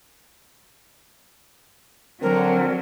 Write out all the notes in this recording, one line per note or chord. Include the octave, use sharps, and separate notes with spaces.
D3 F#3 C4 A#4